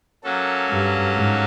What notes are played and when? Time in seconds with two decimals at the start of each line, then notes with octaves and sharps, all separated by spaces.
0.24 F#3 A#3 C#4 F#4 A4
0.70 G2
1.15 G#2